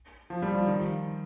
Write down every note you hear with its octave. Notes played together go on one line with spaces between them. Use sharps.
F3
G3
F3
D#3